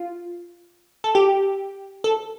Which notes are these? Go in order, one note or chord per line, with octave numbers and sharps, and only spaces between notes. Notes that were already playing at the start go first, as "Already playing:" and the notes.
Already playing: F4
A4
G4
A4